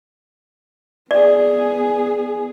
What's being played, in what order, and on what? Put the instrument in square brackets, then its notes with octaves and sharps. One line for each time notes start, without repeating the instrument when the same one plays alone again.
[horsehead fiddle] B3 G#4 [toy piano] D5